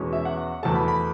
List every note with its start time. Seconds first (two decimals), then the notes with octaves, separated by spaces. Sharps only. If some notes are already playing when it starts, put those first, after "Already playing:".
Already playing: E2 B2 G#3 C#4
0.13 E5
0.25 F#5
0.63 E2 B2 A3 A5
0.75 B5
0.88 B5